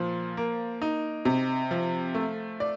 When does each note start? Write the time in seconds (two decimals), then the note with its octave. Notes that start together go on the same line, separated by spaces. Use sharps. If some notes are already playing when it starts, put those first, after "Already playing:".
Already playing: A#2 F3
0.37 A#3
0.82 D#4
1.25 C3
1.71 F3
2.15 A3
2.60 D5